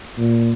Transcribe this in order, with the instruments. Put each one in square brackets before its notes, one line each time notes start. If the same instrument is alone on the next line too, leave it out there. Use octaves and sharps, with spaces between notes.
[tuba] A#2